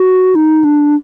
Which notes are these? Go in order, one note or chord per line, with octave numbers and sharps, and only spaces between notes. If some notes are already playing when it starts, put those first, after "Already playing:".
Already playing: F#4
D#4
D4